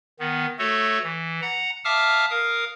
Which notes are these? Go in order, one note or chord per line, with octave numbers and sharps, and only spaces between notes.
D#3 B3
A3 F#4 A4 C#5
E3
F#5 A#5
E5 F5 A5 D6 D#6 F6
A#4 F5 D#6